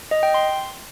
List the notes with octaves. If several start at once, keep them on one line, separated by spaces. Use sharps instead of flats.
D#5
G5
C6